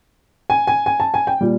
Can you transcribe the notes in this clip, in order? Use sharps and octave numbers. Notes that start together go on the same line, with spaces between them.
G#5
G#5
G#5
A5
G#5
G5
A#2 G3